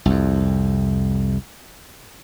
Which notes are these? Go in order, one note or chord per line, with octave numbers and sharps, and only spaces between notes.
C2 F2